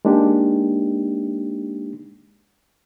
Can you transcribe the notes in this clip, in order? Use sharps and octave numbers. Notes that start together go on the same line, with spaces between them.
G#3 A#3 D4 D#4 G4